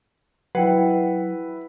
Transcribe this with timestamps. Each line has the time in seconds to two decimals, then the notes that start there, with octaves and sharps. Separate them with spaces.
0.55 F#3 E4 B4 F#5 G5